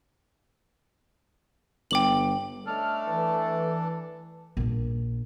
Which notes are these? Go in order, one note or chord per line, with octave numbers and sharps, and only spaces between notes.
G1 G5 D6 F#7
A3 C#4 D4 A4 D#5 F6
E3
A#1 D4